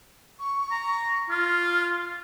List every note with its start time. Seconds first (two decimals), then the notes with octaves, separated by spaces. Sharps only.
0.40 C#6
0.71 A#5
1.30 F4 F6